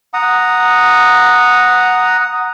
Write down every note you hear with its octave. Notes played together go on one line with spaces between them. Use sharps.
F#5 A#5 D#6